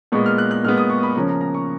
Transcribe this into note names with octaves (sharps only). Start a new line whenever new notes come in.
A#2 G#3 B3 C#6
F6
F#6
F#6
A#2 G#3 B3 F6
D#6
C#6
B5
C#3 F3 A#3 C#4 A#5
A#5
A#5
C#6